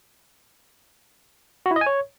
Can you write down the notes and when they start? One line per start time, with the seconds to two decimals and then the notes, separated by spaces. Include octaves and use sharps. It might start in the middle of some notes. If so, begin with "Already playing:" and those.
1.66 F#4
1.71 E4
1.76 D#5
1.81 G#5
1.86 C#5